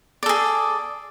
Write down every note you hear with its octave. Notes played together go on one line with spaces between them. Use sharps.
G#4 A4 D5